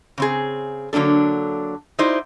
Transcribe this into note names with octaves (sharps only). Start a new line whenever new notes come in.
C#3 C4 G#4
D3 F#3 A#3 D4 A4
D#4 E4 F#4 C5 D5